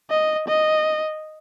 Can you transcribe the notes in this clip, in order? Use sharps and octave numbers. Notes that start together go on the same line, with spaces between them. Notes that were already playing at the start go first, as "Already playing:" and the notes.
D#5
D#5